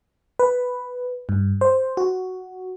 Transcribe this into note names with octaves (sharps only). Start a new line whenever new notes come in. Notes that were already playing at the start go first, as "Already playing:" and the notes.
B4
G2
C5
F#4